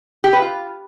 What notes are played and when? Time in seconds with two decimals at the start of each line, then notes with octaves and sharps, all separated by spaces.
0.24 G4
0.33 B4
0.42 F4